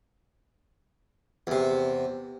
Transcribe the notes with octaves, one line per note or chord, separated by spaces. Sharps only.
E2 C3